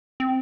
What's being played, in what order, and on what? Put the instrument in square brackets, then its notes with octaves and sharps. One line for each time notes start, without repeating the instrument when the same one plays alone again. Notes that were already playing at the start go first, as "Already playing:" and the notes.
[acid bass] C4